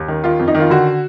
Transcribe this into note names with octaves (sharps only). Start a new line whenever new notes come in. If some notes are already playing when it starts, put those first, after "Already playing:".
Already playing: D#2
D#3
D#3 F4
F2
D#4
D#3
F4
D3 F#4